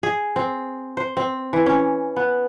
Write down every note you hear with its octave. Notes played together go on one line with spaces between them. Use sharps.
G#4
C4
C5
C4
E3
C#4
B3